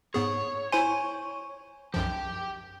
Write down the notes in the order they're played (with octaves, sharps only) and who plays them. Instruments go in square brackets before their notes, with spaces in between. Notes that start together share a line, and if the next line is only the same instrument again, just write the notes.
[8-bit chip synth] G#2 B3 G#4 [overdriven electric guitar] C#5
[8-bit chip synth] E4 C5 C6 [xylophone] G#5
[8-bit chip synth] B1 F#2 F3 [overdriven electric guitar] G4 G5